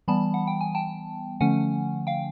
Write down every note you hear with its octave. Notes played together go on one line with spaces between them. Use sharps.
E3 G3 B3 A5 B5
F#5
G5
G#5
G5 A5
D3 F3 A3 C#4 F#5 G#5
F5 G5